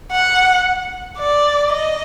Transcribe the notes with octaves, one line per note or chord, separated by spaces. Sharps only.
F#5
D5
D#5